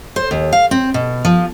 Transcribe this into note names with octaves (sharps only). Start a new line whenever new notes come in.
C5
D#2
F5
C4
B2
F3